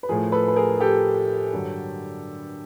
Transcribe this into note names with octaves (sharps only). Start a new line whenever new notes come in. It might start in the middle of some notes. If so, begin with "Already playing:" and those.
B4
A2 F3 G#4 A#4
A4 B4
B4
G#4 A#4
G#4
G4 A4
G2 D3 F#3